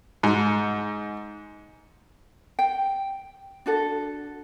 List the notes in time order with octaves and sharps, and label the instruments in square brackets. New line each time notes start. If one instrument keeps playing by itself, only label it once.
[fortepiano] G#2
[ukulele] G5
D4 F#4 A4